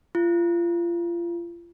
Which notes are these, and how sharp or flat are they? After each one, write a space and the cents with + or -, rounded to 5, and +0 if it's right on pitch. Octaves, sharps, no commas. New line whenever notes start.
F4 -30